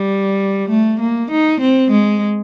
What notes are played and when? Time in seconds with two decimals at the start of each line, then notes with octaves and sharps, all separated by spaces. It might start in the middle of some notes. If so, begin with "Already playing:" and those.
Already playing: G3
0.69 A3
0.99 A#3
1.31 D#4
1.61 C4
1.91 G#3